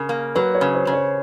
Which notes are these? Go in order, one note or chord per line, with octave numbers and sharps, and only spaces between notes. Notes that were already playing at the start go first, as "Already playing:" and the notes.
Already playing: C#3 A#4
A#3
F#3 B4
C#5
C#3
C5
C#3
C#5